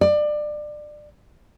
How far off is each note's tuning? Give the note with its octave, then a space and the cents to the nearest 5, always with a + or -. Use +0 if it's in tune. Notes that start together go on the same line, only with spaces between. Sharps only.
D5 +25